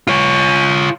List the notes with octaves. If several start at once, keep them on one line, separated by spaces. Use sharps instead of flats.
F4 C#5